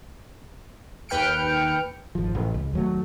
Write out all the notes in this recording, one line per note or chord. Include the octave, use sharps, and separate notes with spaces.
D#2 B4 G5 F6 C#7 D7
G#1 F3
A1
C#2
D#2 F#3 A3